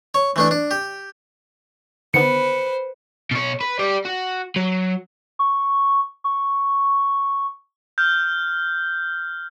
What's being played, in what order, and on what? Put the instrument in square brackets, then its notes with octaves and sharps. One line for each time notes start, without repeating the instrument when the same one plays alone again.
[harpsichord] C#5
E3 A3 D4
D4
G4
[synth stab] D3 D#3 B3 [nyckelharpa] B4 [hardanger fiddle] C5 [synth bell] C#7
[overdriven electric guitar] B2 C#5
B4
G3 D5
F#4
F#3
[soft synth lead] C#6
C#6
[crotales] F6 G6